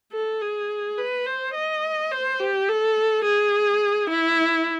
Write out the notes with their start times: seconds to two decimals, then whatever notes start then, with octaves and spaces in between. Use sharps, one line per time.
0.13 A4
0.41 G#4
0.98 B4
1.26 C5
1.54 D#5
2.11 C5
2.40 G4
2.68 A4
3.25 G#4
4.10 E4